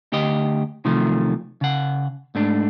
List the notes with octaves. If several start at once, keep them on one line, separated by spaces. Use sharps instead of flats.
D2 G4 D#5
C3 D#3 F3 F#3 A3
C#3 F#5
G#2 A3 D4